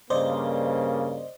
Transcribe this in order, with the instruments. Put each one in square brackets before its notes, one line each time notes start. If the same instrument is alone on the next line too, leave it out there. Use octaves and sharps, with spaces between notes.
[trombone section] G2 C#3 A#3 [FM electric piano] C5 D5 D#5